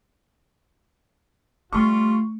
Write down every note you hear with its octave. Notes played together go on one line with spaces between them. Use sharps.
G3 A3 F4 C#6